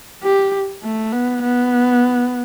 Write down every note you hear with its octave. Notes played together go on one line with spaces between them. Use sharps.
G4
A3
B3
B3